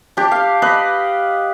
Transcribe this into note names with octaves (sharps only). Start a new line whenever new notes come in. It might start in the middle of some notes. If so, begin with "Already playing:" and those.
D4 G4
F5
B4 D#5 B5